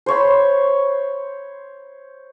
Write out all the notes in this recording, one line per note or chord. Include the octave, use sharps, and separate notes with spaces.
C5 C#5 B5